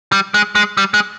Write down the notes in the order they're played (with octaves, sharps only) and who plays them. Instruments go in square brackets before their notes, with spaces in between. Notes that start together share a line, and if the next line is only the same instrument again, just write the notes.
[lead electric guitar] G3
G#3
G#3
G3
G#3